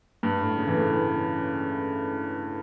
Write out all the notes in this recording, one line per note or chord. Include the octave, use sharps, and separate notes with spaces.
G2
A2
C#3
E3
D3
E3